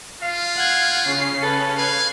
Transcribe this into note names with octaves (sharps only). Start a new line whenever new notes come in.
F4 F5
F#5 G#6
C#3 C#4 C7
A4 B4
B4 F5 G#6